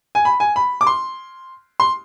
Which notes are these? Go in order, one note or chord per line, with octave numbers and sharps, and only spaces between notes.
G#5
B5
G#5
B5
D6
C6
C6